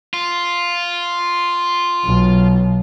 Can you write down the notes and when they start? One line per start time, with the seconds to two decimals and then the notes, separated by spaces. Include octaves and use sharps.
0.14 F4
2.05 B1